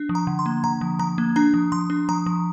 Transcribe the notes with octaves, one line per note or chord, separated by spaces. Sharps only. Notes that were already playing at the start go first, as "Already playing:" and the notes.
Already playing: D4
F3
A#5
D3
C6
A#3
D3 A#5
F3
F3 A#5
A#3
D4 A#5
F3
F3 C6
D4
F3 A#5
F3